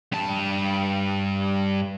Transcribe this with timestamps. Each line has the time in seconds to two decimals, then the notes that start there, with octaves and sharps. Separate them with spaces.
0.12 G2 A5